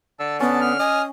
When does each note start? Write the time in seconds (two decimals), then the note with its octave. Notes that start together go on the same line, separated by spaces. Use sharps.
0.20 D3 A5 E6
0.40 B3 C#4 A5
0.61 F6
0.79 D#5 G#5